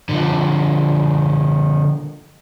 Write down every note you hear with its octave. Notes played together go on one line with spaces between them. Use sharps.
D3 F3